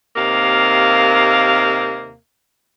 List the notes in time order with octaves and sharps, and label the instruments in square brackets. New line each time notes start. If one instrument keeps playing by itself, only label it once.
[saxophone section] D#2 C3 A#3 F5